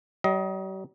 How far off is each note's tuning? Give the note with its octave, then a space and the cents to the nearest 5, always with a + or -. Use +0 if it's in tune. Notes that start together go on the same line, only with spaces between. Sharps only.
G3 -45 D#5 +25